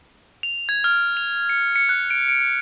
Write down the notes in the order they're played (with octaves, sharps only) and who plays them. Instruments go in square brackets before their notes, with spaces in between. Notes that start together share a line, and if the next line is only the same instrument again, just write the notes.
[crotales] F7
G#6
F6
F7
C#7
C#7
F#6
D7
D7